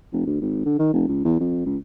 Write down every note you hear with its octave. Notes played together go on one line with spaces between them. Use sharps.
F1
D2
G#1
D3
D#3
F1
C#2
E2
F2
C#2